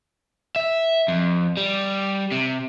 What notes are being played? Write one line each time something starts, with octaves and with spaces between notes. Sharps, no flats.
E5
F2
G3
C3